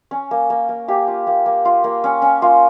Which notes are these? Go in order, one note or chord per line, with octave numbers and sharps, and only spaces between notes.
C#4
A#3
A#3
A#3
A#3 G4
F4
A#3
A#3
F4
A#3
C#4
C#4
A#3 F4